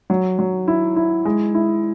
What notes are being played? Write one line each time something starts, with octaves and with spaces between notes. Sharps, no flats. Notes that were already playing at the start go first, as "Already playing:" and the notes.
F#3
F#3
E4
E4
G#3
E4